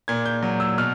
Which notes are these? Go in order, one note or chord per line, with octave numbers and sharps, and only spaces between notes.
A#2 G#6
G6
F#3
E6
B2 F6